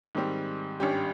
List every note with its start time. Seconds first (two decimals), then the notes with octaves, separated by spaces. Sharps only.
0.15 G#2 D#3 G3 C4
0.80 G#1 G2 G3 C#4 G4